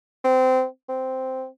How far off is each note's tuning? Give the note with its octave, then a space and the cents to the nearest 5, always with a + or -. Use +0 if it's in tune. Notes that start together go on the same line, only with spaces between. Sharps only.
C4 -20
C4 -5